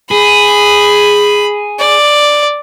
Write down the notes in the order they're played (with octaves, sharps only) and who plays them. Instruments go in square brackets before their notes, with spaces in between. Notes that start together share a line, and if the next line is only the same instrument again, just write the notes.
[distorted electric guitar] G#4 [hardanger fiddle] B5
[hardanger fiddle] D5